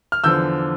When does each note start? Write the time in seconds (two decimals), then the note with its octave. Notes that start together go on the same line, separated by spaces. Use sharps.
0.12 F6
0.23 E2 D3 F3 E6 G6